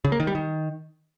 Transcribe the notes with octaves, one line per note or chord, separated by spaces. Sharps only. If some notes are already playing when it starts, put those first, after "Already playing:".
C#3
A#3
D#3
G3
D#3